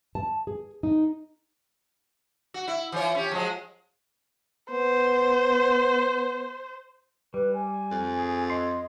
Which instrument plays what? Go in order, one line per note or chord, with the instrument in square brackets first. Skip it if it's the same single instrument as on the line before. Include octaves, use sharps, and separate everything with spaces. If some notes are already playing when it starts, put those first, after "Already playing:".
[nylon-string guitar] A5
G#4
D#4
[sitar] F#4
E4
E3 F4 C#5
C#4 G4
F3 F#3 G#3
[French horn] B3 [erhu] C5
[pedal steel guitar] G3 [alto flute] B4
[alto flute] G#5
[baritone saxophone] F2
[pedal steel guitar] G#4
[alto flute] D#5 [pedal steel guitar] C6